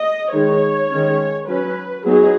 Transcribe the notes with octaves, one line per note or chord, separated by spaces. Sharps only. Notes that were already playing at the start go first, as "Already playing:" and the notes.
Already playing: D#5
D#3 G#3 D#4 C#5
D#3 G#3 C#4
F#3 C#4 B4
F#3 B3 D#4 G#4